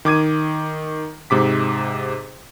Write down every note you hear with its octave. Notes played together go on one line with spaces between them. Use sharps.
D#3 D6 G#6 D#7
G#2 C3 D6 B6